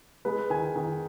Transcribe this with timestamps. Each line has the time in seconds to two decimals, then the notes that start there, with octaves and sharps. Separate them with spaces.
0.25 G#3 B4
0.50 D#3 G#5
0.76 D#3